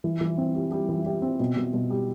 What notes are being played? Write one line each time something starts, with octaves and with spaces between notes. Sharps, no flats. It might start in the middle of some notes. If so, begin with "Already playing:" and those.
E3
E3
C4
G3
G3
E3
G4
C4
B2
B2
B2
G3